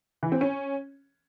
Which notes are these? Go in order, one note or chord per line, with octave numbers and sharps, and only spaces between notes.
E3
C4
C#4